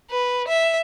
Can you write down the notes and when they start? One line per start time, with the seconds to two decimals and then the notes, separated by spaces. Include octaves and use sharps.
0.11 B4
0.48 E5